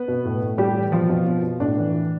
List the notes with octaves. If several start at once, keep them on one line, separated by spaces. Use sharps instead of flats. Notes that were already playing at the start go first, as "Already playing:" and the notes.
Already playing: B3 B4
B2
A2
A2
A2 G3 G4
E3
B2 F3 F4
B2
B2
B2
A2 D4
E3
E3